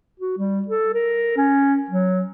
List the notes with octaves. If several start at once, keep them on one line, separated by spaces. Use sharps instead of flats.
F#4
G3
A4
A#4
C#4
F#3